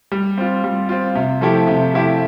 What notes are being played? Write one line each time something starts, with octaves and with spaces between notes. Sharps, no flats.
G3
C4 F4
G3
C4 F4
C3
F3 A3 E4 G4
C3
F3 A3 E4 G4